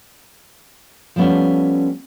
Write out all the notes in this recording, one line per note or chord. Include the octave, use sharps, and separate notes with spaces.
F3 G3 A3 B3 C#4